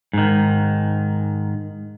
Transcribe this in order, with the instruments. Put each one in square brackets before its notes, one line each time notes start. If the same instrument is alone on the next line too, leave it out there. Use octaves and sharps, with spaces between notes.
[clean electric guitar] G#2 D#3